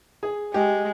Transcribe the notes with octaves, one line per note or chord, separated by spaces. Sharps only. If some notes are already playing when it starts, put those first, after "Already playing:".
G#4
G#3 G4